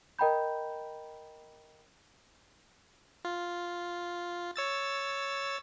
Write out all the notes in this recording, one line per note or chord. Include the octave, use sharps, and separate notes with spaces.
A#4 D#5 G5 A#5 B5 G6
F4
C#5 E6 A6